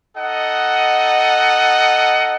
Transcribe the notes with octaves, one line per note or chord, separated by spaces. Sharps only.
D#4 A4 D#5 F#5